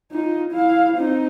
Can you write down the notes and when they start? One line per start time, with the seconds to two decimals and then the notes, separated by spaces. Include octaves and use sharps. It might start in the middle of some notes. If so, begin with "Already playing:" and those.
0.12 D#4 F4
0.51 E4 F5
0.96 C4 D#4